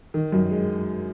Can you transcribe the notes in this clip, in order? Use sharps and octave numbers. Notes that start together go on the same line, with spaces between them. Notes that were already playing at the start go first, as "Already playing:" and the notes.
D#3
F#2
G#3